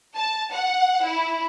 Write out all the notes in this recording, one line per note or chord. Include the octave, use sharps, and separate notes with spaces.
A5
F#5
E4